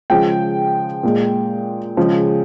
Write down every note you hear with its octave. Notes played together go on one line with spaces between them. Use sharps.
C#3 F3 G#3 G5
A#2 G#3
C#3 F3 G#3